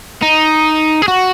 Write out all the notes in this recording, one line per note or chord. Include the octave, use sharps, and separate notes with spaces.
D#4
G#4
F#4